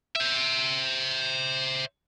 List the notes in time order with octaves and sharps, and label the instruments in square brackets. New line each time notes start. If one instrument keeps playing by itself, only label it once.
[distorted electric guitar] C5 E5